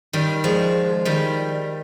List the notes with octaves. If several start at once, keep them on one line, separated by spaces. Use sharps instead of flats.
D#3 G3
F3 G#3
D#3 G3